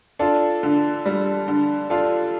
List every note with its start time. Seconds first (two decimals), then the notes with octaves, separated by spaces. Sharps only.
0.19 D4 F4 A4
0.63 D3
1.06 G3
1.48 D3
1.90 D4 F4 A4